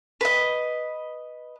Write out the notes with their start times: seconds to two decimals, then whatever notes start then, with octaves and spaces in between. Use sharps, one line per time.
0.21 B4 D#5